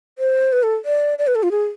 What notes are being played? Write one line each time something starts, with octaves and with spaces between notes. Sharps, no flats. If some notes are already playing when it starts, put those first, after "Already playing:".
C5
B4
A4
D5
D5
B4
A4
F4
G#4